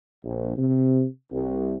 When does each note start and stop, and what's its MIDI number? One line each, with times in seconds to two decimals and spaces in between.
0.24 0.57 34
0.57 1.04 48
1.31 1.75 36